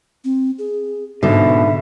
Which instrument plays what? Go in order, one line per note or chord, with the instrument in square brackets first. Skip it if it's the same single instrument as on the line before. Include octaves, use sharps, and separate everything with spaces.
[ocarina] C4
G#4
[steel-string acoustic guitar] G#2 D3 [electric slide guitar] B2 [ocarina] E5